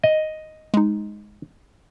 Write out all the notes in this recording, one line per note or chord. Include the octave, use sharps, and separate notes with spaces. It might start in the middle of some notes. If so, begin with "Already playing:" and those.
D#5
G#3 D#4